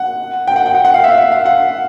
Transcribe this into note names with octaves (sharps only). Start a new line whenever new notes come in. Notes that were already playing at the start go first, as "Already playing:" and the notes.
Already playing: F#5
G5
F#5
G5
F#5
F#5
F5
E5
F5
F#5